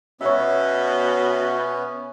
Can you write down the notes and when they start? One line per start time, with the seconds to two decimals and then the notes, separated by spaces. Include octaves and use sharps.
0.21 B2 B3 C#4 C#5 E5